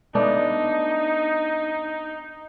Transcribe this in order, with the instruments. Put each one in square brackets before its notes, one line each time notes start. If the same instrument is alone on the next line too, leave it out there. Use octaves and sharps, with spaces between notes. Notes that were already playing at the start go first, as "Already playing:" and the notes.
[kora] A3 B3 D4 [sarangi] D#4